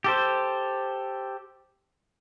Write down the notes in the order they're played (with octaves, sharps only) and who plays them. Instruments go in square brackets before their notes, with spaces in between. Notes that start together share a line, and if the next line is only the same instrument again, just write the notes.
[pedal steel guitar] G4 A4 C5